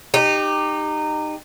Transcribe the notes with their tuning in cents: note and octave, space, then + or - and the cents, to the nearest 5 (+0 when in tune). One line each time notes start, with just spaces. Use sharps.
D#4 -20 G4 +10